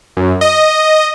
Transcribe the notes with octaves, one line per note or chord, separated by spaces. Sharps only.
F#2
D#5